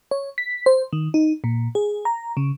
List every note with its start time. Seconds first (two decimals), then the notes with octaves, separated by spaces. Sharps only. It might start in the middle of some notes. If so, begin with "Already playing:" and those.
0.11 C#5
0.38 B6
0.66 C5
0.93 D#3
1.14 D#4
1.44 A#2
1.75 G#4
2.05 A#5
2.37 C#3